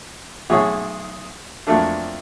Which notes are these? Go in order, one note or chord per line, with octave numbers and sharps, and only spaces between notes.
B1 A3 G#4 C#5 F#5
F2 F#3 A3 A#3 D4 A4